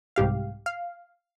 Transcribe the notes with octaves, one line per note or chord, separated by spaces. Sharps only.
C2 G#2 G4 F5
F5